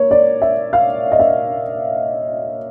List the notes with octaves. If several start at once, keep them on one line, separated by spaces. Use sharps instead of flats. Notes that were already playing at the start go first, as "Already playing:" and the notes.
Already playing: A#3 C#5
D5
E5
F5
D#5
E5